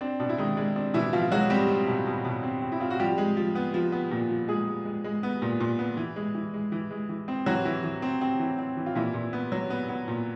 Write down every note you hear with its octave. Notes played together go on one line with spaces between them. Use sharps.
C4 D4
B2 D4
E4
D#3 G#3 D#4
G#3 D4
C4 D4
B2 E3 E4
B2 F3 F4
F#3 G#3 F#4
G3 C4 G4
C4
B2
B2
B2
C4
C4
E4
C4 F4
F#4
F3 G3 G4
G#3
F3
B3
F3
B3
A#2
F3
F3 G#3 G#4
G#3
G#3
G#3
B3
A#2
A#2
B3
E3
G#3
E3
G#3
E3
G#3
E3
C4
E3 F#3 F#4
E3
E3
C4
C4
E3
C4
E3
F4
A#2 E3 E4
A#2
B3
F#3
B3
B3
A#2